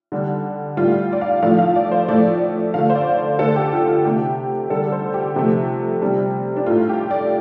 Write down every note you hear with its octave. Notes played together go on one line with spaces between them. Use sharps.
D3 G3
A2 G3 F4
D5
F5
A2 F3 A3 F5
F5
D5
C5
A2 F3 A3 D5
D3 A3 F5
C5
D5
C5
D3 A3 A4
G4
F4
F4
C3 A3 G4
D3 G3 A4
C5
G4
C3 F3 A3
C3 G3
D4
A2 A3 F4
G4
D5